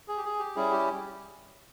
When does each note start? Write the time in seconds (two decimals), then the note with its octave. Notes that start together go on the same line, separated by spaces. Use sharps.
0.08 G#4
0.17 G4
0.25 G#4
0.39 G4
0.56 G3 C#4 E4 G#4
0.72 G4